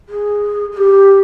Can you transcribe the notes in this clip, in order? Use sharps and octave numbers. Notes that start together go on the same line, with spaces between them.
G#4
G#4
G4